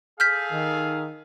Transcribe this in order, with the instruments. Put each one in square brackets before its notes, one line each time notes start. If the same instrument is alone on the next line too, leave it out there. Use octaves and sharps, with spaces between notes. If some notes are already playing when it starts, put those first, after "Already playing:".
[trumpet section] G#4 A4 F5 [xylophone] F6 G6 B6
[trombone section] D#3